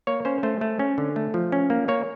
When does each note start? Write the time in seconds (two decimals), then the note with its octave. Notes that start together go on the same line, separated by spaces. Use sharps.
0.07 A#3 C#5
0.25 C#4 C5
0.43 A3 C5
0.61 A3
0.79 C#4
0.98 D3
1.16 A3
1.34 F3
1.52 C#4
1.70 A#3
1.88 A#3 C#5